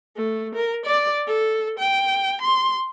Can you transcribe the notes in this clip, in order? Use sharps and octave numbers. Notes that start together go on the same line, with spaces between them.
A3
A#4
D5
A4
G5
C6